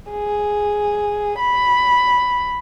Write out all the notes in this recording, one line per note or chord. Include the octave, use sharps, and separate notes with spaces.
G#4
B5